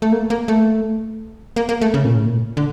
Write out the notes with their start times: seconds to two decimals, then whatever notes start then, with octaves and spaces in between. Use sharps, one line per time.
0.02 A3
0.12 A#3
0.30 A#3
0.48 A3
1.56 A#3
1.69 A#3
1.81 A3
1.94 C#3
2.05 A#2
2.15 A2
2.26 A#2
2.57 D3